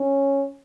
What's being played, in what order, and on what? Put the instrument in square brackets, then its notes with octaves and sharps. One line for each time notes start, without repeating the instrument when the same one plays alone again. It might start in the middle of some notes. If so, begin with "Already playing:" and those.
Already playing: [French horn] C#4